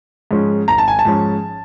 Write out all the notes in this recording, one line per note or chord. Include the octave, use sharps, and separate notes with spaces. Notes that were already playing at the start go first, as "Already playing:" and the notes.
G#2 F3 G#3 C#4
G#1 A#5
A5
G#5
A5
G#2 F3 G#3 C#4